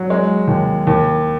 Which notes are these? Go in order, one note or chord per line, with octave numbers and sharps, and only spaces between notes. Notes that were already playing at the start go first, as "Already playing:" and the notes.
Already playing: F#3
G#3
D#2
D#2